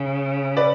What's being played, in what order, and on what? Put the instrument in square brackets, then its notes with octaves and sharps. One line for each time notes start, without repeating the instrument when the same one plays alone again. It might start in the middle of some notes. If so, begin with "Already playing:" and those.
Already playing: [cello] C#3
[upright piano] B4 D5